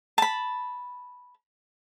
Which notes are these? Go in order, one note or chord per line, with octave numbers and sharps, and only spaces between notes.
A5 B5